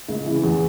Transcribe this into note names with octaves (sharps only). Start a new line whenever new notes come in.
C#2
C#3 E3
E2